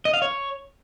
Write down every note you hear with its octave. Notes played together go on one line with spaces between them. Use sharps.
D#5
F5
C#5